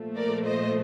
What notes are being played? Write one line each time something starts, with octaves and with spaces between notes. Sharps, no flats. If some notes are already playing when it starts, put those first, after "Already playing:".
Already playing: A#2 F3 A3
A#4 D5
C5 D#5